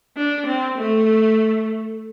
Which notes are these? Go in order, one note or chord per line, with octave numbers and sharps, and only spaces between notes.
D4
C4
A3